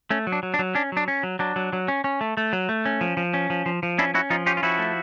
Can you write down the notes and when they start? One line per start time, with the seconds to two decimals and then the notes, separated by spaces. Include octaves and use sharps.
0.11 A3 C#4
0.27 F#3
0.32 D4
0.43 F#3
0.54 D4
0.59 F#3
0.75 C#4 D4
0.92 F#3 D4
1.08 C#4
1.23 F#3
1.39 F#3 D4
1.56 F#3
1.73 F#3
1.88 C#4
2.04 C#4
2.21 A3
2.37 A3
2.53 F#3
2.69 A3
2.85 C#4
3.01 F3
3.17 F3
3.34 C#4
3.50 F3
3.66 F3
3.83 F3
3.98 C#4 D4 E4
4.14 C#4 E4 F#4
4.30 F3 D#4 F4
4.46 C#4 F4 G4
4.57 F4
4.63 F3 E4 F#4
4.79 A3